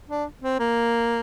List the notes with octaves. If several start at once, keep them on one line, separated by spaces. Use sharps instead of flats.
D4
C4
A#3